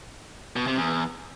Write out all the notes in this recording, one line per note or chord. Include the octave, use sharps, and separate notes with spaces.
B2
C3
E2